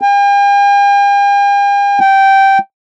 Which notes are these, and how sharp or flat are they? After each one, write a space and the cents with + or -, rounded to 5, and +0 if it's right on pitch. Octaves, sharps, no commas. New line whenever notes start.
G5 +45
G5 -10